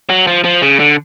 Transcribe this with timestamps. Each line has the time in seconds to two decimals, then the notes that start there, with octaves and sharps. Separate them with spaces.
0.10 F#3
0.27 F3
0.44 F3
0.62 C#3
0.80 D3